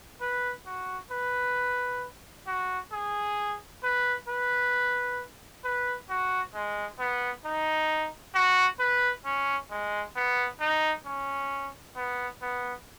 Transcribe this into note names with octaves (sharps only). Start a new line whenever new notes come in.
B4
F#4
B4
F#4
G#4
B4
B4
B4
F#4
G#3
B3
D#4
F#4
B4
C#4
G#3
B3
D#4
C#4
B3
B3